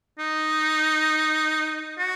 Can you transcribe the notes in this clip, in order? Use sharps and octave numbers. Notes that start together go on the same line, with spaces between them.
D#4
F#4